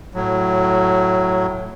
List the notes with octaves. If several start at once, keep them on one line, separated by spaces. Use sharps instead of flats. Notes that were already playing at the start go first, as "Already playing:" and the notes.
A2 F#3